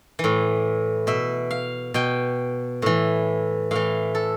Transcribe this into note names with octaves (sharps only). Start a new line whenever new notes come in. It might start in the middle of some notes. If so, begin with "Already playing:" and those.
A2 E3
B2 E5
F5
B2 G5
A2 E3
A2 E3 F5
A4